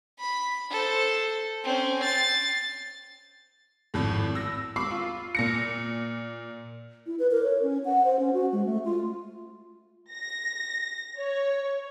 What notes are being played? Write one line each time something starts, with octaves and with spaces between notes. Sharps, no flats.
B5
A4 C5
C4 C#4
A6 C7
G#1 F2 A2
E6 A#6
B5 C#6 D6 E6 C7
F4
A#2 A#6 C#7
E4
B4
A#4
C#5
C#4
F#5
C5
C#4
F#4
G#3
A3
F4
A#6
C#5